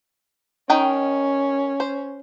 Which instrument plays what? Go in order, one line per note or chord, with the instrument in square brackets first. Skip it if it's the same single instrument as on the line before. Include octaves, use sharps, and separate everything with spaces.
[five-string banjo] D#3 D#4 G5 [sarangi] C#4
[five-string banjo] C5